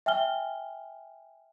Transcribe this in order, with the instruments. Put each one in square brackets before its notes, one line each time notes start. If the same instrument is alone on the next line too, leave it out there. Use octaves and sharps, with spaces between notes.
[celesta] E5 G5 G#5 F6 G7